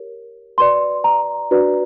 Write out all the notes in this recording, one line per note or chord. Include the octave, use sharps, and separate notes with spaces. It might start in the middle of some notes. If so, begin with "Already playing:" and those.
Already playing: G4 A#4 C#5
F#4 B4 D5 C6
A#5
D4 F#4 B4 D5